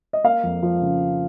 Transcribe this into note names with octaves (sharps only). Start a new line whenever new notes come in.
D#5
A#3 F5
F2
F3
C#3